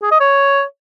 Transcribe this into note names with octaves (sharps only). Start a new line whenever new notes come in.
G#4
D#5
C#5